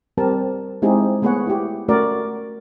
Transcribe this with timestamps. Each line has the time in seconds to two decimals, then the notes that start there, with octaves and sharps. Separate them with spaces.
0.17 G3 C4 G4 A#4 A5
0.82 G#3 C4 D#4 E4 G4 G#4
1.22 A3 B3 G#4 B4 C#5 F#5
1.47 E4 G4
1.88 A3 C#4 F#4 A#4 D5